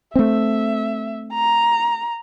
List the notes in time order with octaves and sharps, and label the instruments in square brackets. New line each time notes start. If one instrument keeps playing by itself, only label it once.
[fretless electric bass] A3 C4 [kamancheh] E5
[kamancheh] A#5